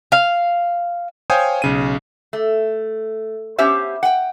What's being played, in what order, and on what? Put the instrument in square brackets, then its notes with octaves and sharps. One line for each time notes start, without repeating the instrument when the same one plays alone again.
[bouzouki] F5
[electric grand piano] C5 C#5 F5 G5 G#5 D#6
B1 C#3 D#7
[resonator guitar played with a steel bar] A3
B3 C#4 G4 C5 E5
F#5 G5